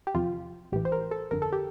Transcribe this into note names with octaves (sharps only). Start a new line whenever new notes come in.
G4
E2 C3 F3 F4
A#1 A2 E3 G4
C5
A#4
A4
G1 F2 D3 A#4
A4
G4